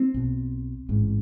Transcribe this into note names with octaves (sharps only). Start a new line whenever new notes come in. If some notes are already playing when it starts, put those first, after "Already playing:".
Already playing: C4
B1 B2
A1 G#2